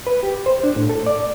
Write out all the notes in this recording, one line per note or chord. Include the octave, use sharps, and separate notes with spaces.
B4
G4
C5
D4
A2
A4
D5